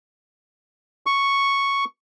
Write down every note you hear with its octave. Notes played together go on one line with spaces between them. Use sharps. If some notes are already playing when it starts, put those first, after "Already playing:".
C#6